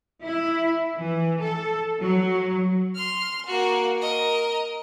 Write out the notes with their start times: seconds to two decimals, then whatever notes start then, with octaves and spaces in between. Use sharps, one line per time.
0.24 E4
0.97 E3
1.41 A4
2.00 F#3
2.95 C6 F6
3.46 A#3 F#4
4.01 A#4 D#5